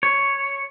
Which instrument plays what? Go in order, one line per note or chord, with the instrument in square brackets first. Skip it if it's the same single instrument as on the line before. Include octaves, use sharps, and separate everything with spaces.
[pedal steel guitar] C#5